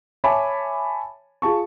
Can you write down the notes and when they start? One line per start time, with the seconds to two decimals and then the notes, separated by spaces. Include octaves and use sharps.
0.24 C#5 E5 G#5 A5 B5 D6
1.42 F4 G#4 A5 C#6